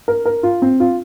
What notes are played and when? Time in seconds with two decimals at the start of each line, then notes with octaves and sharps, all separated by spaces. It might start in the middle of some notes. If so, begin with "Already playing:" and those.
0.08 A#4
0.25 A#4
0.43 F4
0.62 C4
0.80 F4